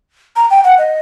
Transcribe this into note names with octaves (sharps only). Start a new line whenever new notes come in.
A#5
G5
F#5
D#5